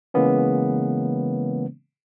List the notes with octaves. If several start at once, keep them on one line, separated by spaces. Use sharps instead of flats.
C#3 E3 G#3 A#3 B3 C#4